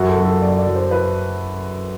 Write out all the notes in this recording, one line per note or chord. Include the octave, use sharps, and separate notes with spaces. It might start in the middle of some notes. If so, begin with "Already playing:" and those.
Already playing: F#2 F#4
A4
F#3
A4
F#2 D5
D5
F#3
C5
B4